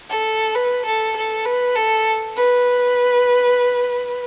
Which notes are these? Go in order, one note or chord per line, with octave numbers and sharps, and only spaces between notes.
A4
B4
A4
A4
B4
A4
B4